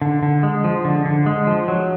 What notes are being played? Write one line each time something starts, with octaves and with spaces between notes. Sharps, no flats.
D3
D3
G#3
F3
D3
D3
G#3
F3
F#3